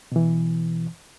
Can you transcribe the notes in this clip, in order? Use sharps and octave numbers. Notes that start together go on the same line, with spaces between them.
B2 E3